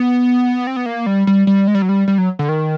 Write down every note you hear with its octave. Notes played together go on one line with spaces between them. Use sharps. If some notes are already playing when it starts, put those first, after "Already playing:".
Already playing: B3
C4
B3
A#3
G3
G3
G3
G#3
G3
F#3
G3
G3
F#3
D3
D#3